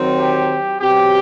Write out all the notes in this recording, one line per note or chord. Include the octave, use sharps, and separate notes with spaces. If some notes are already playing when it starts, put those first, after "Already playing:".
Already playing: D#3 F#3 C4
G4
B2 F#3 C4 G4